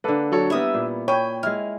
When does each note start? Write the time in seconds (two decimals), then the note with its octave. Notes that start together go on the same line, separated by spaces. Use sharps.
0.04 D3 A#3 A4 B4
0.32 F#3 A4 C#5
0.50 G3 B3 E4 A#4 E5 D#6
0.74 A#2
1.08 C#5 G5 B5 D#7
1.43 G#3 E4 F6